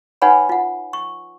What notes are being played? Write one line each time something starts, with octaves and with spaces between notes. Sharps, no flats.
D#4 B4 C#5 F#5 G#5 B5
F4 F#5
C#6